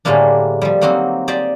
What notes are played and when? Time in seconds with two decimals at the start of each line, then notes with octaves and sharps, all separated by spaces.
0.05 A2 D3 G3 G#3 A#3 D4
0.62 F3 G3
0.81 F#3 A#3 C4 D#4 F#4
1.28 G4 C5 D5 D#5